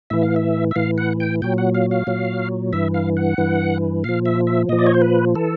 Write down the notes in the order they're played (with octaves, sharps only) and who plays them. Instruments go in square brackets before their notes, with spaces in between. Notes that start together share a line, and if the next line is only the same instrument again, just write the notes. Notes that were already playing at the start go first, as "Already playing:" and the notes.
[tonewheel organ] A2 E3 E5
F5
E5
E5
A2 E3 F5
F#5
G5
A#2 F#3 G5
F#5
F5
F5
A#2 F#3
G2 E3 E5
F5
F#5
G2 E3
A#2 F3 F5
E5
E5
A#2 F3 D#5
D5
C#5
C5
B4
E3 A4